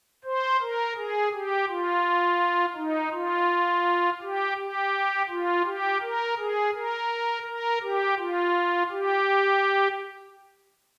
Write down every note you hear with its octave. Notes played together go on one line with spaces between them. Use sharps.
C5
A#4
G#4
G4
F4
D#4
F4
G4
G4
F4
G4
A#4
G#4
A#4
A#4
G4
F4
G4